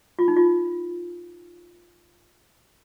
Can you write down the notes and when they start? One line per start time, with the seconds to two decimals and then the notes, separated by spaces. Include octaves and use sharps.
0.19 F4
0.28 D#4
0.36 F4